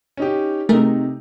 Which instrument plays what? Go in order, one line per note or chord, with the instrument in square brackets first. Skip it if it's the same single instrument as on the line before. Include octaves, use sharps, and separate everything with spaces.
[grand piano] C#4 D#4 G4
[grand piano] C3 D#4 [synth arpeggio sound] A3 G#4 A#4